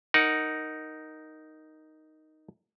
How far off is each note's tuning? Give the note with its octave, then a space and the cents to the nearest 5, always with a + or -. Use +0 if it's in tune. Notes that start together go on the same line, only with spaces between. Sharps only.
D#4 +0 A#4 +0 F#5 +0